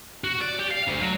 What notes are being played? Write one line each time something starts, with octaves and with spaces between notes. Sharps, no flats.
F#4
D5
G4
F5
D2
F#3